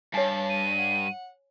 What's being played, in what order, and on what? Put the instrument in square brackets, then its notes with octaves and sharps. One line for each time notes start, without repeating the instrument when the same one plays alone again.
[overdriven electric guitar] G2 [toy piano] C#5 G#5 [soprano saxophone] A5
[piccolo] D#7
[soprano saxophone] F#5